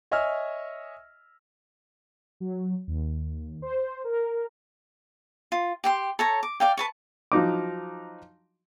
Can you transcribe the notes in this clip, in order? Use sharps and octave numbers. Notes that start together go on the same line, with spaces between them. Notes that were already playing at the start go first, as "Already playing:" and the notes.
C#5 D#5 E5 G#5 E6 F6
F#3
D#2
C5
A#4
F4
G4 G5 C6
A4 C#5 A#5
D6
D5 F5 G5
B4 A5 C#6
F3 F#3 D#4 D6